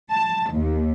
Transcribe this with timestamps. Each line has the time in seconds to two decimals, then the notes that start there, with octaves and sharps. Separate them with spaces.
0.12 A5
0.52 D#2